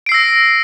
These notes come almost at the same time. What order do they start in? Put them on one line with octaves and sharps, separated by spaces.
D7 C7 E6 A#6